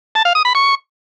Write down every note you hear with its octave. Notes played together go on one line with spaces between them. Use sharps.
A5
F5
D#6
B5
C#6